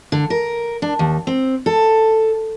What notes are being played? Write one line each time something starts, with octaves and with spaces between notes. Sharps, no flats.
D3
A#4
D4
D#2
C4
A4